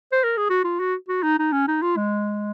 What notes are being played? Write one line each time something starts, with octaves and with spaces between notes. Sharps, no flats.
C5
A#4
G#4
F#4
F4
F#4
F#4
D#4
D#4
C#4
D#4
F4
G#3